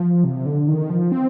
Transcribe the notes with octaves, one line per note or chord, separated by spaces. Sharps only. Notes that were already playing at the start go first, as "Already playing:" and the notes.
Already playing: F3
C3
D3
D#3
F3
C4